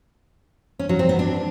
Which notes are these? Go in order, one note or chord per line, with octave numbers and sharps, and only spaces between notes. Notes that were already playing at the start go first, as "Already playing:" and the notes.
C#4
F#3
C4
B3
D4